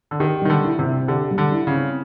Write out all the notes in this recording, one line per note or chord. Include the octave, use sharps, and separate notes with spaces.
D3
D#3 G4
D#3 G3
D3
E4
C3
C4
D3 G4
G3
D3
E4
C#3
C4